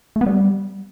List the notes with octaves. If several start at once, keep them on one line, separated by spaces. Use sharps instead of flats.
A3
B3
G3